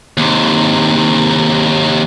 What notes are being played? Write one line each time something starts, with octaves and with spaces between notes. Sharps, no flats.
D#2 C3